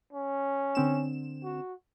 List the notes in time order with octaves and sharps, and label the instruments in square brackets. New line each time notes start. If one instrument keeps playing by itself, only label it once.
[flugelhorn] C#4
[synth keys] D3 C4 E7
[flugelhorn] F#4